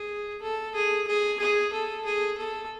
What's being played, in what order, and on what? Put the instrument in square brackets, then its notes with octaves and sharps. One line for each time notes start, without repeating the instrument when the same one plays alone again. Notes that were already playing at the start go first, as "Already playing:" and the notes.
Already playing: [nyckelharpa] G#4
A4
G#4
G#4
G#4
A4
G#4
A4